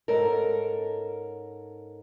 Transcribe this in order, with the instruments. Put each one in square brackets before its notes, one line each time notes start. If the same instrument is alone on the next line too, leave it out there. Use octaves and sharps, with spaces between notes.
[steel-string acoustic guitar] G#2 C#4 A4 A#4